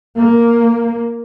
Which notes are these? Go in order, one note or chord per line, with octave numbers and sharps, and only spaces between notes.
A#3